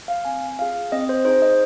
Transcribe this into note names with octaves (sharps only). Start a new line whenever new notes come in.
F5
C4 G#5
F4 G#4 F5
C4 D#5
C5
D#4 G#4 C5
D#5